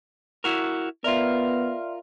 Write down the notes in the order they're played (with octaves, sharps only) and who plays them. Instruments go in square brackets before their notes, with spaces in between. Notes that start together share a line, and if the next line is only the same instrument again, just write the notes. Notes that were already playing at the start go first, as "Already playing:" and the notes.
[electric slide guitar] E4 F#4 A#4
[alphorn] B3 [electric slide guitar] F4 A#4 [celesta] D5 E5 C6